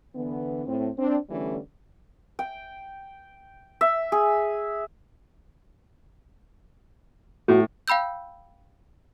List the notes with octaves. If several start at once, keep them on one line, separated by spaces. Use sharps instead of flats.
D3 E3 B3
A2 C4
C4 D4
E2 D3 E3 G3 A3 C#4
G5
E5
G#4
A2 F#4
F5 G5 B5 E6 G6